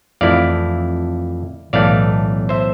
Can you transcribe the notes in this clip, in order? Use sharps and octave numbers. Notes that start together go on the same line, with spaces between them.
F2 E3 A3 E4 D5 F5
B1 A2 E3 A3 D5 F5
C5 E5